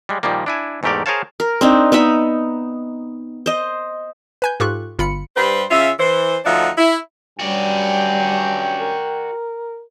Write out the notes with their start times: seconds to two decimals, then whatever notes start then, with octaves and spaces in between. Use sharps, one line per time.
0.09 G3 G#3
0.23 A#2 D#3 F3 G3 A#3
0.46 D4 E4 G#5
0.83 E2 G#2 A3 G4 A#4 D5
1.06 G#4 A#4 C5 C#5 F5 A5
1.40 A#4
1.61 C4 D4 D#4
1.92 B3 D#4 E5 B5
3.46 C5 D#5
4.42 B4 G#5 G6
4.60 G#2 F4 G4 A4 C#6 F#6
4.99 G1 F4 B5 C#7
5.35 G2 G3 B4 C5
5.71 C#3 C#4 F4 E5
5.99 E3 C5
6.45 D2 F3 D4 D#4 E5 F#5
6.78 E4
7.40 G2 F#3 G3 C#4 F#4 D5 G5
8.79 A#4